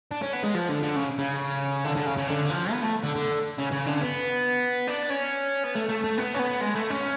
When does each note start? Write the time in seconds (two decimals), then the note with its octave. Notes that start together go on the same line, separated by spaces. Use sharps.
0.11 D4
0.22 C#4
0.33 B3
0.43 G#3
0.55 F3
0.69 D3
0.83 D3
0.96 C#3
1.18 C#3
1.85 D3
1.96 D3
2.06 C#3
2.17 C#3
2.28 D3
2.45 D3
2.50 F3
2.72 B3
2.83 A3
3.03 D3
3.15 D3
3.58 C#3
3.72 C#3
3.86 D3
4.01 B3
4.88 D4
5.10 C#4
5.64 B3
5.75 A3
5.89 A3
6.04 A3
6.18 B3
6.34 C#4
6.39 B3
6.61 G#3
6.75 A3
6.91 C#4